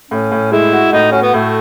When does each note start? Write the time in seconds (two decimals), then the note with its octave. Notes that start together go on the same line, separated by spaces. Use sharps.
0.11 A2 C#4
0.32 A2
0.52 G#3 E4
0.73 F#4
0.92 A2 D#4
1.12 C#4 F#4
1.22 B3
1.34 A2 A3